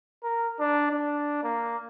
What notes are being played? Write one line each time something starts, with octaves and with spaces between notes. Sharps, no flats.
A#4
D4
D4
A#3